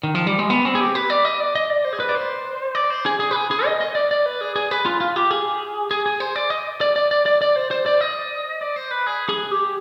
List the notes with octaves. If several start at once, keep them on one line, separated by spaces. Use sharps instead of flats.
D#3
F3
G3
G#3
B3
C4
G#4
G4
B4
D5
D#5
D5
D#5
D5
C5
G#4
B4
D5
C5
D5
C5
G#4
G#4
B4
G#4
G#4
D#5
D#5
D5
D5
B4
G#4
G#4
B4
F4
F4
G4
G#4
G#4
G#4
C5
D5
D#5
D5
D5
D5
D5
D5
C5
C5
D5
D#5
D5
C5
B4
G#4
G#4
G4